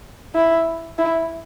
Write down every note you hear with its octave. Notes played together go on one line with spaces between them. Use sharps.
E4
E4